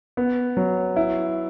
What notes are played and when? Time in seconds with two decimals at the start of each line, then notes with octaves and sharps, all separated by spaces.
0.17 B3
0.57 F#3
0.96 E4